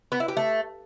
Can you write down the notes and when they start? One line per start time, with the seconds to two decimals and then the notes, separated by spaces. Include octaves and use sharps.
0.12 B3
0.20 E4
0.28 G4
0.37 A3